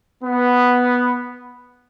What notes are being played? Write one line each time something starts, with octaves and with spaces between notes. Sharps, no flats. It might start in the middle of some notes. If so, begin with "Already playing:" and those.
B3